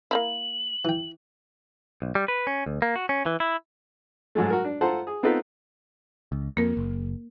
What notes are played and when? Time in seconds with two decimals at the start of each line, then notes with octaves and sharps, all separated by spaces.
0.11 A#3 D#4 E4 F#7
0.85 E3 G5
2.02 B1
2.15 G3
2.28 B4
2.47 C#4
2.66 D2
2.82 A#3
2.96 F#4
3.09 C#4
3.26 E3
3.40 E4
4.35 G#2 F#3 G#3 A3
4.50 F#4 A#4
4.65 D4
4.81 F4 A4 C5 F#5 A5 A#5
5.07 G#4
5.23 B3 C4 D#4 F4 A4 B4
6.32 C#2
6.57 F2 A#3 A#4
6.77 F#1